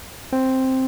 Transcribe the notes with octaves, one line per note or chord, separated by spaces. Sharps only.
C4